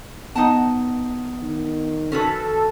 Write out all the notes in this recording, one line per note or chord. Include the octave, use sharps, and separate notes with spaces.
B3 D#4 F#5 A5 D#6
D#3
C#4 F#4 A4 B4